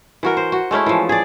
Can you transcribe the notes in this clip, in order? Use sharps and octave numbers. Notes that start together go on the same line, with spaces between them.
E3 F#4 A#4
C5
F#4
G#3 A3 C#4 E4
E3 F3
G#4 D5